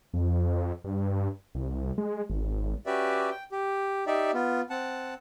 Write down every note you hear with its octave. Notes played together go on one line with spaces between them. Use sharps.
F2
G2
C2
G#3
G#1
C#4 F#4 G4 B4 D5 E5
G5
G4
D#4 G4 D5 E5
B3 F4
C4 F#5 A5